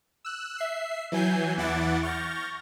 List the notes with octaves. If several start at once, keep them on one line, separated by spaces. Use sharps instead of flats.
E6 F#6
E5 C7
E3 F#3 G#5 G6 C7
E2 E3 E4 F#5 D6 A6
C#6 F6 G6 A6 A#6